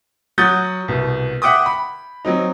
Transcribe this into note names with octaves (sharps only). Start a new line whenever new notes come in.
F#3 F#4 F#5 D#6 G6 A6
C2 B2
E5 F#5 G5 D6 D#6
B5
F#3 C4 D#4